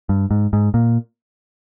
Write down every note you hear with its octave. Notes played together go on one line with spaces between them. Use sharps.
G2
G#2
G#2
A#2